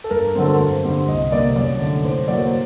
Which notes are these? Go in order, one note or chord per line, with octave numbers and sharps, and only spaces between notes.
A4
G2 A#4
D3 F#3 A3 C4 A4
A#4
G2 C5
D3 G3 C4
C2 D#5
C3 G3 A#3 D5
F#2 D5
D3 A3
A2 C5
F#3 A#3 D5
C5